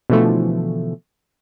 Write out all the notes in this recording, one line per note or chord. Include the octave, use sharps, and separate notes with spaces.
B2 D3 E3 F3 A3